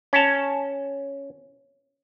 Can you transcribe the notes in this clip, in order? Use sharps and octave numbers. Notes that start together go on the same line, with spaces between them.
C#4 A5